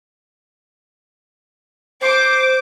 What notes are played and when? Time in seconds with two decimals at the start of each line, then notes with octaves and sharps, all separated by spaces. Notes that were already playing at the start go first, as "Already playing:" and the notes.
2.01 C5 D6